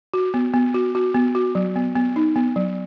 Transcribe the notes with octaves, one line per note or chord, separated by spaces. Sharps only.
F#4
B3
B3
F#4
F#4
B3
F#4
F#3
B3
B3
D#4
B3
F#3